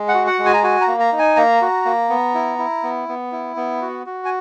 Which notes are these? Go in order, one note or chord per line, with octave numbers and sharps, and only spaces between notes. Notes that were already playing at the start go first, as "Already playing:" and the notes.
Already playing: G#3
F#5
F#4
F#5
G#3
G#5
A#5
F#4 G#5
A#5
A#3
A#5
D#4
G#5
A#3 A#5
F#4
A#3
B3
E4
E4
B3
B3
E4
B3
F#4
F#4
G#5